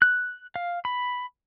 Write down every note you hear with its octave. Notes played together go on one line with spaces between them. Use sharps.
F#6
F5
B5